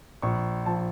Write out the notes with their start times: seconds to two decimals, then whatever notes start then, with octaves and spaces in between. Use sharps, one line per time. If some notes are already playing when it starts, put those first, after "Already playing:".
0.22 A#1 C#6
0.66 F3 A5